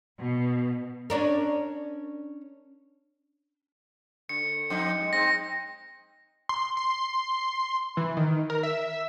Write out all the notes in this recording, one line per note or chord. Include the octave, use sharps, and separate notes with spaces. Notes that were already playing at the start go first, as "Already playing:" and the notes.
B2
C#4 D4 A#4
D3 C#7
F2 C4 D#4
G#3
G#3 C4 D#4 A#6
C6
C6
E3
D#3
A#4
E5